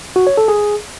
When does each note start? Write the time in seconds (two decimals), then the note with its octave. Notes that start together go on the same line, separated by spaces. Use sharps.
0.16 F#4
0.27 C#5
0.37 A4
0.48 G#4